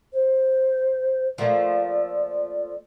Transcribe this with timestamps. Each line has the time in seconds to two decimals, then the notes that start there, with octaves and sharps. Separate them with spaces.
0.13 C5
1.38 F3 A3 A#3 D5